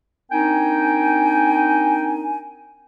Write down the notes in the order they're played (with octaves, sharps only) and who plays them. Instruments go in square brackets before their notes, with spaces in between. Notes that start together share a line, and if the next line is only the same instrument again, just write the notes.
[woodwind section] C4 D4 D#4 A#4 G5 G#5